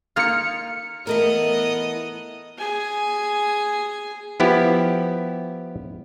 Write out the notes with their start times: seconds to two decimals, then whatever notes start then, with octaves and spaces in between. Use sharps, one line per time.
0.16 A#3 D#4 F4 F6 C#7
1.07 E3 A3 B3 A#4 D#5
2.58 G#4 G#5
4.40 F3 B3 E4 G4